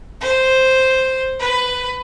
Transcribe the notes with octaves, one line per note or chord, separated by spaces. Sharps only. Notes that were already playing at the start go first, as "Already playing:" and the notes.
C5
B4